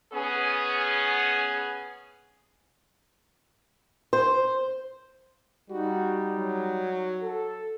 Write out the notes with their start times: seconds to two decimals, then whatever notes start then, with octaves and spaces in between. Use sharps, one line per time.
0.13 B3 C#4 G#4
4.13 C5
5.70 G3 D#4 F#4
6.37 F#3
7.22 A4